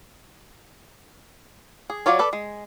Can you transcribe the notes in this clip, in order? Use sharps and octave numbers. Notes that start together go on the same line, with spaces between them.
G#4
F#3 F4 C#5 D5
A4 B4 D5
G#3